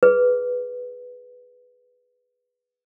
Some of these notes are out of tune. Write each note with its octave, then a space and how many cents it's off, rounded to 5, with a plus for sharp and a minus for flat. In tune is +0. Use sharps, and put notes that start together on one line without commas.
G#4 +0 B4 +0